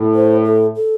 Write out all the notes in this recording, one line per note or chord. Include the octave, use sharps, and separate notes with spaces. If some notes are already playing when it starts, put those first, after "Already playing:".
Already playing: A2
C5
A4
A4